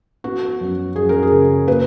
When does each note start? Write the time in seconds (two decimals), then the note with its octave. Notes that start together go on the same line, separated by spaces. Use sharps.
0.24 B3 F#4
0.61 F#2
0.96 F#2 G#4
1.09 A#4
1.22 G#4
1.32 C#3
1.67 A#3 B4